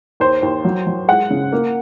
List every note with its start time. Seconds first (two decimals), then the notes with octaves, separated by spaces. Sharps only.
0.20 D#2 C5
0.43 D#2
0.65 F#3
0.87 F#3
1.08 G#3 F#5
1.30 C#3
1.52 A#3